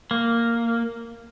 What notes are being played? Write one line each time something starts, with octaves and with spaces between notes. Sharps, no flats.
A#3